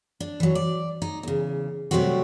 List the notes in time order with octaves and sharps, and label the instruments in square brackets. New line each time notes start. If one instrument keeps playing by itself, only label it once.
[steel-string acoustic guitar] D4
E3 F#3
D5
D#4
E2 C#3
C3 F#3 G3 A3 C4 F#4